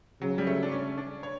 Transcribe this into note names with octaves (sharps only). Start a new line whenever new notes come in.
C#3 F#3
G3
A3
D4
C#4
D4
C#5